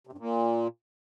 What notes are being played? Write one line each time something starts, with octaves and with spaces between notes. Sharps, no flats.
C3
G2
A#2